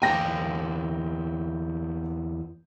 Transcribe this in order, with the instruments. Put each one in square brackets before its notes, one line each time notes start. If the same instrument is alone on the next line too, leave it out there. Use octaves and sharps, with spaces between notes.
[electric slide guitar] E2 A#3 G#5 [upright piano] G5 A#6